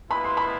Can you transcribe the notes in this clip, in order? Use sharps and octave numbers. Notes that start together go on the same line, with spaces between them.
G#3 B3 E4 B4 F5 B5
C6
B5